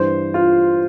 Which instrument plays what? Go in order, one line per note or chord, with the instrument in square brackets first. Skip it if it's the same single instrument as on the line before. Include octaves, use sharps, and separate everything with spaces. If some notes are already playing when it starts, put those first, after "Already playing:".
Already playing: [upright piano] G2 E3 C5
F4